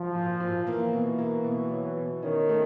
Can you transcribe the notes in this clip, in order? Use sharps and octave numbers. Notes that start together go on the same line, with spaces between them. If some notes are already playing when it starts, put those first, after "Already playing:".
Already playing: F3
A#2
A#2
E3 A#3
B2
A#3
B2
F#3
B2
D#3 C#4
A3